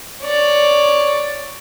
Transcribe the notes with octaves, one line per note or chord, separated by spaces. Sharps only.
C#5 D5